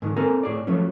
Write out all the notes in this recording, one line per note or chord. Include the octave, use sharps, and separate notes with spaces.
G#2 D3 D#3
C4 A4 A#4 G#5 A#5
A2 G#4 D5
F3 F#3 A3 C#4